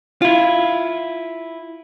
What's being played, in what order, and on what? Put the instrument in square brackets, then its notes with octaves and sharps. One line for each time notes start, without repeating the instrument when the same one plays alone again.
[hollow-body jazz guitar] E4 F4